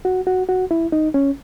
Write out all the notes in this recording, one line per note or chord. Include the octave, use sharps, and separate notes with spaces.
F#4
F#4
F#4
E4
D#4
C#4